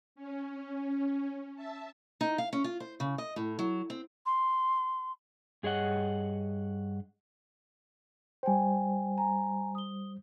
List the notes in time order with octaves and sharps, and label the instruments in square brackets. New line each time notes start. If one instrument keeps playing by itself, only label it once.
[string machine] C#4
E5 A5
[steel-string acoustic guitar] D#4
F5
C#4
F4
C5
C#3
D#5
A2
F#3
C4
[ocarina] C6
[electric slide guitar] G2 G#4 C#5 D#5 F#5
[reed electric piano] G3 C5 [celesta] G5 G#5
[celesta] G#5 A#5
D#6 G7